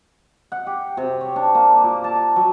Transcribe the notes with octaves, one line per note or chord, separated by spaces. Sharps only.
F#5
G4
C3
C#5
D4
A#3
A#2
A5
F#3